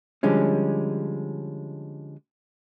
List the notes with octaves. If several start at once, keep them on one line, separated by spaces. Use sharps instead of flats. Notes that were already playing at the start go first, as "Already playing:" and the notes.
D3 F3 G3 G#3 C#4